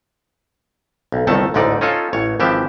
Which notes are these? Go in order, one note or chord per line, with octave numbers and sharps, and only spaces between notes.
B1
G1 C2 D#3 A3 A4 A5
A1 D2 G#2 D3 D#4 D5
C#4 D#4 F4 A4 G#5
A1 C#5
G#1 E3 F3 G4 E5